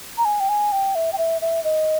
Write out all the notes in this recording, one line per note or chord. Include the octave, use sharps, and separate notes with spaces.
A#5
G#5
G5
G#5
G5
E5
G5
E5
E5
D#5